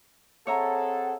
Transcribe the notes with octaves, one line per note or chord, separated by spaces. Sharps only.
C4 G#4 A4 C#5 E5 F#5 A#5